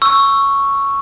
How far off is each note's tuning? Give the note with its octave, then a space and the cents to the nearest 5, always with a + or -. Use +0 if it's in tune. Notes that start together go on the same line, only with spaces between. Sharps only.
C#6 +0 E6 +10